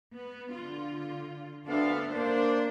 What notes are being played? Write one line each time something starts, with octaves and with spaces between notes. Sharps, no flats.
B3
D3 F4
D2 B3 D4 A4 E5 F5
A#3 D4 C5 D5